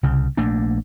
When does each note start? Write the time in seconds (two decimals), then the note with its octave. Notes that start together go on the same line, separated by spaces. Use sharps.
0.03 C2 C#3
0.37 A#1 A3 A#3 D4